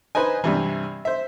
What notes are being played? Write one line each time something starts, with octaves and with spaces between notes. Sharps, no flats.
D#4 B4 C5 D#5 G#5
G2 C3 E3
C5 E5